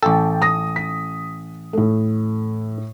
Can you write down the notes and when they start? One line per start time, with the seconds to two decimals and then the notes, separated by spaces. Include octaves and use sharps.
0.03 A1 A4 G5 A5
0.42 D#6 A#6
0.76 B6
1.73 A2 A3